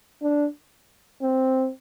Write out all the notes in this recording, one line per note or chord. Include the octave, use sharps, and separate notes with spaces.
D4
C4